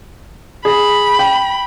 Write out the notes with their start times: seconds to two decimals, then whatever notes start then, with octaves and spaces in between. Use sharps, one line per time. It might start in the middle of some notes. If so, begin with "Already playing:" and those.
0.65 G#4 B5
1.19 G5